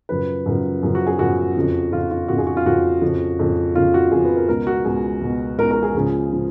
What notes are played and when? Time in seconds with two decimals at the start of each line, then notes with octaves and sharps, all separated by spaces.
0.09 F#2 C#3 F3 B4
0.46 F#2 C#3 F3
0.83 F#2 C#3 F3
0.95 F#4
1.07 G#4
1.19 F#2 C#3 F3 F#4
1.56 F2 C#3 F3
1.92 F2 C#3 F3 F4
2.11 F4
2.28 F2 C#3 F3 F#4
2.38 G#4
2.47 F#4
2.57 F4
2.65 F2 C#3 F3 F#4
3.02 F2 C#3 F3
3.39 F2 C#3 F3
3.75 F2 C#3 F3 F4
3.94 F#4
4.11 F2 C#3 F3 G#4
4.25 B4
4.37 A#4
4.48 C#2 B2 A#4
4.67 F#4
4.85 C#2 B2 G#4
5.21 C#2 B2
5.58 C#2 A#4
5.63 B2
5.71 A#4
5.83 G#4
5.94 C#2 C#3 F3
6.32 C#3 F3